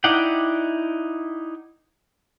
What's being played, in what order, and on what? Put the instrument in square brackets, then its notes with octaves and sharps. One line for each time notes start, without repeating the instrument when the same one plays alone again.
[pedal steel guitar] D#4 E4 D5 F#5 G5